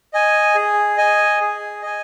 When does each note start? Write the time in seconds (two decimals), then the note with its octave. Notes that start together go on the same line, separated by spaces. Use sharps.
0.14 D#5 G#5
0.55 G#4
0.97 D#5 G#5
1.40 G#4
1.82 D#5 G#5